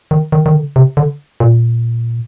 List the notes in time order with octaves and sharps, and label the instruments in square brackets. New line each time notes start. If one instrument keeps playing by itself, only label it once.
[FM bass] D#3
D#3
D#3
D3
C3
D3
A#2